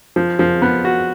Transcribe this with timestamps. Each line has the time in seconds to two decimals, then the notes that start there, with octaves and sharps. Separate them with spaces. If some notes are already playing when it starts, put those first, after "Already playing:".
0.16 F3
0.39 F3
0.62 B3
0.85 F#4